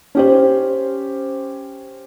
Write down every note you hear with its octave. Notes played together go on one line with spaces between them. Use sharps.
C#4 G4 C5